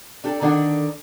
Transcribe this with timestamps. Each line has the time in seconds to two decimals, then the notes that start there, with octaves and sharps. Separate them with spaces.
0.24 D4 G4 A4
0.41 D3 D#3 D4 A4 F#5